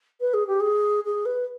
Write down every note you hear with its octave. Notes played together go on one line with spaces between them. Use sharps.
B4
G#4
G4
G#4
G#4
B4